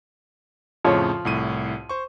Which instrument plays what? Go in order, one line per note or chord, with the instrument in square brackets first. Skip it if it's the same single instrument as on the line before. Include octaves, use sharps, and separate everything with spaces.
[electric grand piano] F2 A2 C#3 [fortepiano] F3 C#5
[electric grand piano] C2 A2 D#7
C5 C#6